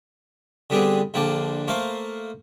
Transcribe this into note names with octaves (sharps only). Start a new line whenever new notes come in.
D3 G3 B3 C4 D4 G#4
A#1 D3 F3 A#3 D4 G5
A3 A#3 A#4 C5 F5